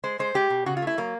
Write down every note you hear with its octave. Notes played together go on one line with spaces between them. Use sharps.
G#3 C5
G#3 C5
G#3 G4
B2
C#3 F#4
F4
A3 E4
F#3 A#3